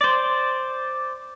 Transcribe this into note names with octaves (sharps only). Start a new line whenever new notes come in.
C5 D5